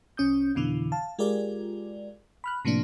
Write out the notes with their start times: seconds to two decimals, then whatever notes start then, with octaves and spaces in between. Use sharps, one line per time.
0.17 C2 C#4 D#6 G6
0.55 F2 B2 D3 E3
0.92 F5 A5
1.19 G#3 F4 G4 G#4 A#4 D5
2.44 B5 F6 F#6
2.65 A2 C3 F3 A#3 D4